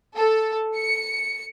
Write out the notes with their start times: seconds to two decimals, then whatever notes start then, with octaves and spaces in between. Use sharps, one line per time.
0.16 A4
0.76 C#7